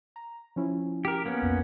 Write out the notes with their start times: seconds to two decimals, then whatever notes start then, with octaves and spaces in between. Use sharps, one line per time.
0.16 A#5
0.56 F3 C#4 E4
1.05 G4 A#4
1.26 A#3 B3 C#4
1.42 B1 F2